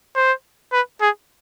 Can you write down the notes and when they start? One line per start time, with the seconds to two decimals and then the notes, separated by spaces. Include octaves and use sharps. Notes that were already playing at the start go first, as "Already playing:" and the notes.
0.15 C5
0.72 B4
1.01 G#4